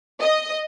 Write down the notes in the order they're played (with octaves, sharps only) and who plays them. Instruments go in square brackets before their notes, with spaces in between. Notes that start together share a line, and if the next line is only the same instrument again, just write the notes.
[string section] D#5